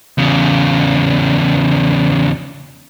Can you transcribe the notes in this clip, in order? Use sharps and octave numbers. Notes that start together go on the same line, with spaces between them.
E2 C#3